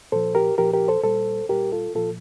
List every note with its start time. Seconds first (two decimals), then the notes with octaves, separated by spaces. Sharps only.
0.12 A#2 F3 A4 C5
0.35 G4 A#4
0.58 A#2 F3 G4 A#4
0.73 G4 A#4
0.88 A4 C5
1.04 A#2 G3 A4 C5
1.49 A#2 G3 G4 A#4
1.72 F4 A4
1.95 A#2 F3 F4 A4